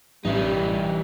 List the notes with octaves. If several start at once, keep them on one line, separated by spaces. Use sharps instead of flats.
A1 E3 G3 D#4